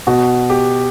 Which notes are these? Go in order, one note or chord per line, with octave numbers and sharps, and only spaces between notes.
B2 F#4
G4